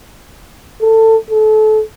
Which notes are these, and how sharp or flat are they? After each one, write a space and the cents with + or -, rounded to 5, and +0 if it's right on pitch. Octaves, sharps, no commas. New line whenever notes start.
A4 +20
A4 -30